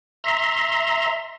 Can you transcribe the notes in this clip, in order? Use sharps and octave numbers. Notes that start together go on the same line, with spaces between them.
E5 A#5 C6